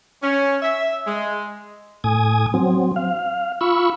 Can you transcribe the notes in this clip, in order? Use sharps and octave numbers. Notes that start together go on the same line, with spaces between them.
C#4
E5
G#3
A2 G#5 D#6
F#3 C4
F5
F4 B5 C#6 E6